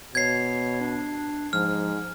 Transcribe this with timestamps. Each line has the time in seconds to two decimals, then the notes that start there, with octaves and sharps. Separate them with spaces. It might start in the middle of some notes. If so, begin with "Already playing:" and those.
0.15 B2 C#5 G#6 C7
0.81 D4
1.53 G#2 F3 F6